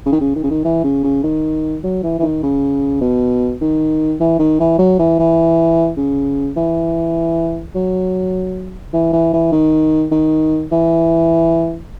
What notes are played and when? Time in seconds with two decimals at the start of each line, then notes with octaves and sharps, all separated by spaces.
0.06 C#3
0.12 D#3
0.20 C#3
0.36 D#3
0.44 C#3
0.50 D#3
0.64 E3
0.84 C#3
1.04 C#3
1.23 D#3
1.83 F#3
2.03 E3
2.19 E3
2.22 D#3
2.43 C#3
3.01 B2
3.61 D#3
4.20 E3
4.39 D#3
4.60 E3
4.78 F#3
4.99 E3
5.19 E3
5.97 C#3
6.57 E3
7.75 F#3
8.93 E3
9.13 E3
9.33 E3
9.52 D#3
10.11 D#3
10.71 E3